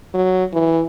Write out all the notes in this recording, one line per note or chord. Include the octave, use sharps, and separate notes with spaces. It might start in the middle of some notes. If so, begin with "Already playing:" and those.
F#3
E3